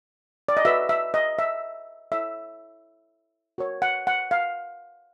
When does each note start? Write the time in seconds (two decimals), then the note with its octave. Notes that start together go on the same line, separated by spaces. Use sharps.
0.49 D5
0.57 D#5
0.65 F#4 B4 E5
0.89 E5
1.14 D#5
1.39 E5
2.12 E4 A4 C#5 E5
3.58 F#4 A#4 C#5
3.82 F#5
4.07 F#5
4.31 F5